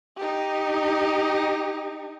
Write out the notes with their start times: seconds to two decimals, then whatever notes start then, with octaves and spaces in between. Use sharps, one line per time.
0.17 D#4 G4